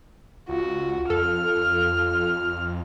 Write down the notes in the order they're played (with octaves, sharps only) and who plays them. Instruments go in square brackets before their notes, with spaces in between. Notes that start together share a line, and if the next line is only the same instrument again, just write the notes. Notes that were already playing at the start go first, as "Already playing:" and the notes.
[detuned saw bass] C#2 [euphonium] F4 [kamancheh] F#4
[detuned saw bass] F2 [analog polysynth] A4 [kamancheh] F6